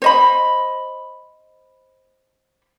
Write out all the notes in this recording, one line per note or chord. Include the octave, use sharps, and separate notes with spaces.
C5 D#5 B5